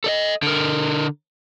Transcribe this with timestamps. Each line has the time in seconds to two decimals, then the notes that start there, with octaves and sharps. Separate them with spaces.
0.04 A4 D5 D#5
0.42 D3 A#4